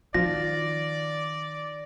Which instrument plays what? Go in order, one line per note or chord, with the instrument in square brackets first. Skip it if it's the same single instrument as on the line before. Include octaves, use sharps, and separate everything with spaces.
[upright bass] D#3 [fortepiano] F3 [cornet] D5 [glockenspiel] A#6